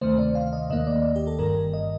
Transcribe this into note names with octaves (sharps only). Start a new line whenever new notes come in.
D2 C3 D#3 A3 C5
D5
F5
D#5
D#2 D#3 A#3 D#5
D5
G4
A4
G1 G2 D#3 A#4
D#5